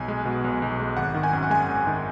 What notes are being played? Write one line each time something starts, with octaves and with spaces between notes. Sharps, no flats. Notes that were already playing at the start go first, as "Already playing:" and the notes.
Already playing: B1 G#5
G#3
B2
B1
B1
G#3
G#1 F#5
D#3
G#5
F#2
F#5
G#3 G#5
G#1
D#3